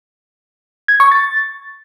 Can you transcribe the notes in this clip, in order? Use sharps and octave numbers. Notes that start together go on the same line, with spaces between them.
G#6
C#6
A6